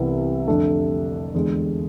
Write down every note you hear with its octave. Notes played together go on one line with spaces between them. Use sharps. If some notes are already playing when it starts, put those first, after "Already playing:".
Already playing: C2 C3 E3 B3 E4
F2 D3 A3 D4 A4
E2 D3 G#3